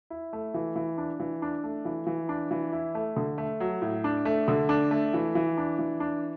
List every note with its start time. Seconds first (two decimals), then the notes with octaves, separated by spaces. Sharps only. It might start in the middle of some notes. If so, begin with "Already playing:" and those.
0.10 E4
0.33 A3
0.54 E3
0.76 E3
0.98 D4
1.20 E3
1.42 D4
1.64 A3
1.85 E3
2.07 E3
2.29 D4
2.51 E3
2.72 E4
2.95 A3
3.16 D3
3.38 A3
3.60 F#3
3.82 A2
4.04 D4
4.25 A3
4.48 D3
4.69 D4
4.91 A3
5.14 E3
5.35 E3
5.58 D4
5.79 E3
6.00 D4